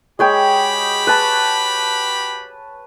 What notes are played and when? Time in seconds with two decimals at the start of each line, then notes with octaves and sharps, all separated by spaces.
0.19 G#3 F#4 G4 C#5 G5 B5
1.07 B4 A5